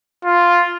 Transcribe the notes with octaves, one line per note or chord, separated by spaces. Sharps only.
F4